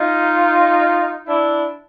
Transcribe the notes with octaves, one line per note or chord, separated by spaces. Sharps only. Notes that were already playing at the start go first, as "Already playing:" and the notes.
Already playing: D#4 F4
D4 E4